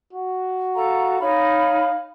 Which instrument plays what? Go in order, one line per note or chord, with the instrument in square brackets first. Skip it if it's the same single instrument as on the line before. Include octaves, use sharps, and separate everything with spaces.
[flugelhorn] F#4
[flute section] A4 F5 A#5
[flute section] D#4 C#5 B5 [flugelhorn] F5